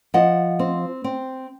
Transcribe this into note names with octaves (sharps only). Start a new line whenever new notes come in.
F3 D#5 F#5
C4
C4